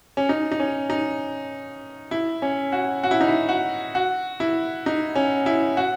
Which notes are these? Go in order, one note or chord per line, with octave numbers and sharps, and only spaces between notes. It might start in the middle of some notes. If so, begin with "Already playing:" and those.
C#4
D#4
D#4
C#4
D#4
E4
C#4
F#4
F#4
E4
D#4
E4
F#4
F#4
E4
D#4
C#4
E4
F#4